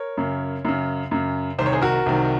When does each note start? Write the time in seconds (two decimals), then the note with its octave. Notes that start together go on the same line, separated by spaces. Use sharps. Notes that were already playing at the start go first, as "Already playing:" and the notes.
Already playing: A#4 C#5
0.17 F#2 C#3
0.65 F#2 C#3
1.11 F#2 C#3
1.58 C2 C3 D#3 C5
1.66 C#5
1.72 G#4 C5
1.82 F#4 A#4
2.06 C2 C3 D#3